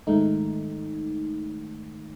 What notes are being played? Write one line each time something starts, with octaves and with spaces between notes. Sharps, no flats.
G#2 D#3 A3 D#4